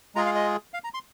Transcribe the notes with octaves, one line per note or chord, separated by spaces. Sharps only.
G#3 F4 G#4 A#5
F5
D#5
F5
A#5
C6